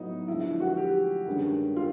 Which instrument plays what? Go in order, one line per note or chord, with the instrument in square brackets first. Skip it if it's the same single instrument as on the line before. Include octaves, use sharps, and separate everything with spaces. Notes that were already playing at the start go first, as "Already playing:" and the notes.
Already playing: [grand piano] A2 F#3 B3 [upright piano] D#4
[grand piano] D3 F3 G#3 [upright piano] E4
[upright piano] F#4
G4
[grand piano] G2 D#3 G#3 C#4
[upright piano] F4